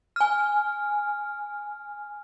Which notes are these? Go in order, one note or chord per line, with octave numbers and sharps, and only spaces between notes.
G#5 F6